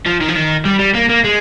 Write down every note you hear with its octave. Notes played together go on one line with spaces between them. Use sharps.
F3
D#3
F3
D#3
G3
G3
A#3
A#3
G#3